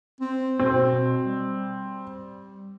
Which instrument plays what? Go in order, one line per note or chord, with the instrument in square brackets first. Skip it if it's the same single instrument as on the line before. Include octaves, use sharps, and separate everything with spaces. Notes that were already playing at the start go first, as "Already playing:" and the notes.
[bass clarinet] C4
[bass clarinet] B2 [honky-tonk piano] C4
[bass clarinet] G3